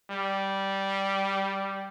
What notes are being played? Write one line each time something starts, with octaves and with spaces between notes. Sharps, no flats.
G3